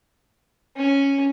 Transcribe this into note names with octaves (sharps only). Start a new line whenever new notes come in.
C#4